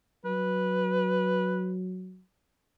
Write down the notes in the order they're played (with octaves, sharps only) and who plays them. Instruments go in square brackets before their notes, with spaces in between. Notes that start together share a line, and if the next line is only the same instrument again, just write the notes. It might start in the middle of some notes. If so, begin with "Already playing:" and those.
[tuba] F#3 [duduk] B4